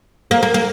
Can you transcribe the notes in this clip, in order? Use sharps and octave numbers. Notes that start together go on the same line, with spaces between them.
A#3
A#3
A#3